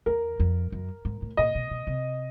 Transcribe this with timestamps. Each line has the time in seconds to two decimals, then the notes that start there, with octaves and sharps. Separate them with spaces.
0.06 E2 A#4
0.40 F2
0.72 F#2
1.05 G#2
1.22 A2
1.37 A#2 D#5
1.55 B2
1.71 B2
1.87 C3